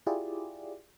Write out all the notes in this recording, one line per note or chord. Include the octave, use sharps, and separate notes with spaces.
E4 F4 G4 G#4 D5